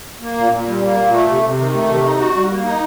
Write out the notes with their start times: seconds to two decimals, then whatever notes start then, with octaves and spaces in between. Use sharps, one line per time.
0.22 A#3
0.37 A#2
0.52 A#2
0.67 G3
0.82 A#3
0.97 A#2
1.12 A3
1.28 C3
1.43 C3
1.59 D#3
1.74 A3
1.88 C3
2.04 D#4
2.19 F#4
2.34 G3
2.49 A#3
2.64 D#4